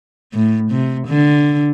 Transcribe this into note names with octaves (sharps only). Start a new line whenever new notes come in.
A2
C3
D3